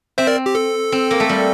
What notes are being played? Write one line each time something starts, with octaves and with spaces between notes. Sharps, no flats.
C4 C5 E5
A#4 D5
G4
A4
C4
A#3
A3
G3